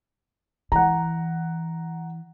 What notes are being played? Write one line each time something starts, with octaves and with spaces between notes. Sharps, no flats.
E3 F#5 A#5